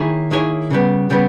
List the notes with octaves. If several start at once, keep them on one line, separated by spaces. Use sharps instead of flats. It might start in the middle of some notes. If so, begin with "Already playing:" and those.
Already playing: D#3 A#3 E4 G#4 C#5
D#3 A#3 E4 G#4 C#5
C#3 G3 B3
C#3 G3 B3